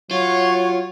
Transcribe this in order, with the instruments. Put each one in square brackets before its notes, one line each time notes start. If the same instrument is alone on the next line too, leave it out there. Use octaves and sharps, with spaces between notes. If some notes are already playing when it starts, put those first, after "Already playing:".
[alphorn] F#3 [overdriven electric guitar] F4 [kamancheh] C#5 F#5